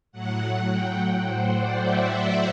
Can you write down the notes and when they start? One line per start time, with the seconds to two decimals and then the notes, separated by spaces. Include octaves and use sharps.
0.12 A2 F#3 F#5
0.68 G5
1.25 C5
1.54 D5
1.82 E5